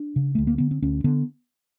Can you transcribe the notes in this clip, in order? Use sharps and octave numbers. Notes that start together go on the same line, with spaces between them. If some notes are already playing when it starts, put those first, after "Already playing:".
Already playing: D4
C#3
D2 A3
A#3
D3 B3
C4
D2 C#4
D3 B3